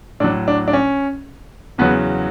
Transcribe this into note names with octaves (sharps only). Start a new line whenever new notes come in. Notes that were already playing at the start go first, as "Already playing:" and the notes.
A2 F#3 D4
D4
D4
C#4
E2 C#3 F#3 B3